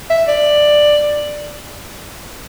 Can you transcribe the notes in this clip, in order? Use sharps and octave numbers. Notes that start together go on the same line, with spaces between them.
E5
D5